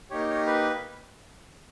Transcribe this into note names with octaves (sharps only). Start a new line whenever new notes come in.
A#3 D#4 G4 C#5
C#5
B4